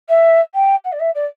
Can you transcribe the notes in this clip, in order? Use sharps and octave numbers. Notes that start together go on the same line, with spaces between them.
E5
G5
F#5
D5
E5
D5